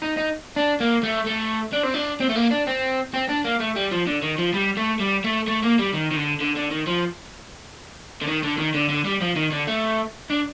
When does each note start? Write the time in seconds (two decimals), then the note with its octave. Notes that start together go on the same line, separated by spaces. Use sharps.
0.02 D#4
0.17 D#4
0.56 D4
0.80 A#3
1.03 A3
1.26 A3
1.73 D4
1.83 C4
1.94 D4
2.20 C4
2.29 A3
2.35 A#3
2.51 D4
2.67 C4
3.14 C4
3.29 D4
3.44 A#3
3.60 A3
3.76 G3
3.91 F3
4.07 D3
4.22 D#3
4.38 F3
4.53 G3
4.77 A3
5.00 G3
5.24 A3
5.48 A3
5.63 A#3
5.79 G3
5.93 D#3
6.11 D#3
6.16 D3
6.41 D3
6.56 D3
6.71 D#3
6.87 F3
8.21 D3
8.27 D#3
8.43 D3
8.58 D#3
8.74 D3
8.89 D3
9.05 G3
9.21 F3
9.36 D#3
9.52 D3
9.67 A3
10.30 D4